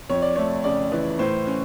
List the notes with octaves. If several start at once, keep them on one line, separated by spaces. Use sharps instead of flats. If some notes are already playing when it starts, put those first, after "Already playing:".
F2 C#5
D5
A3 C#5
C#3 D5
E3
A2 C5
C#4